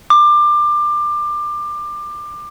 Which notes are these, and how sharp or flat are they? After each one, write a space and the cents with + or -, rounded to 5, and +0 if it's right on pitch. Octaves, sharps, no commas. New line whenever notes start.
D6 +25